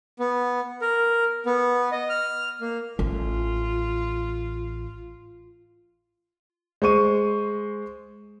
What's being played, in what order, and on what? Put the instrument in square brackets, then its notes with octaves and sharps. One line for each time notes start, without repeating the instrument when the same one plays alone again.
[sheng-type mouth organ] B3
A#4
B3
D#5
F6
A#3
[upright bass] A1 [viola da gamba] F4
[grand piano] G#3 C5 C#6 D#7